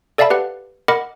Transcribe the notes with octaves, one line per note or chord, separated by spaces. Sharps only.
A4 D5 E5 F5 A5 B5
G4 B4 F#5
A#4 D#5 F#5 B5 D6